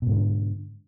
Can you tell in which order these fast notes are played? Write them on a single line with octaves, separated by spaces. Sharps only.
B2 G#2 D3